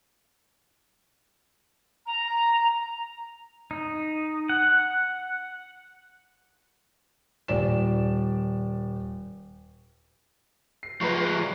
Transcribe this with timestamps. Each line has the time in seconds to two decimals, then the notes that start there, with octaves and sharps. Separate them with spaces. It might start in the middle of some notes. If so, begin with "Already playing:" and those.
2.06 A#5
3.71 D#4
4.49 F#5
7.48 D#1 D5 E7
10.83 C7
11.01 F3 G#3 B4 A#5 C#6